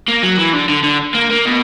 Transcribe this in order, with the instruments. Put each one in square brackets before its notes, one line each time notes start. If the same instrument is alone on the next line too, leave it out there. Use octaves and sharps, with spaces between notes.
[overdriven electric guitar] A#3
F#3
E3
D3
D3
D3
A#3
A#3
B2